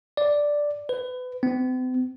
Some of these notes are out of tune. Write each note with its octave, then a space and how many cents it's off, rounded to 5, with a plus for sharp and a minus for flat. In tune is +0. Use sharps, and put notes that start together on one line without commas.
D5 +0
B4 +30
C4 -45